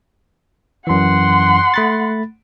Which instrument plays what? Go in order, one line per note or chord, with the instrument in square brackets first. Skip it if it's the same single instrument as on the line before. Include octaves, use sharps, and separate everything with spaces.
[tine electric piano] F#2 E3 [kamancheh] F#5 C6
[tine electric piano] A3 B5 A6